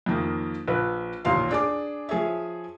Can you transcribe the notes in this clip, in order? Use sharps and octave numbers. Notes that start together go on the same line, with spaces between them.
F2 D#3 A#3
A#1 B4
A1 D#2 A#2 F5 C6
D4 G#4 D6
F3 G#4 C#5 E5